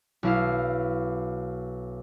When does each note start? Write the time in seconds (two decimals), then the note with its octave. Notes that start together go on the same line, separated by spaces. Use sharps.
0.23 B1 E4 F5